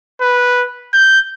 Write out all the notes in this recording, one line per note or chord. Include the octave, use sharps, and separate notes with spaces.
B4
G6